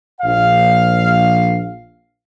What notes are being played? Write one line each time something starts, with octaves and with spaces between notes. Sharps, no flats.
A#1 F5